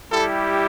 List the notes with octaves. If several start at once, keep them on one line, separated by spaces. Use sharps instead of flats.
G3 E4 G4 A4